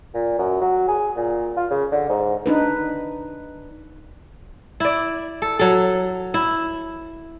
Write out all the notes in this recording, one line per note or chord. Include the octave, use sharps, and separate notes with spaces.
A#2
F#2
F#3
G#4
A#2
F4
C#3
D3
G#2
D4 D#4 B4
E4 D5
A4
F#3 A4
E4